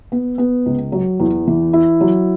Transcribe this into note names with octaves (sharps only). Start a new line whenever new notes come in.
B3
B3
C#2
F#3
E2
E3
E4
F#3